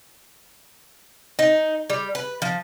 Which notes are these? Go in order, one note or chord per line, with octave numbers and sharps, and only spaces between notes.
D#4
G3
B4
F3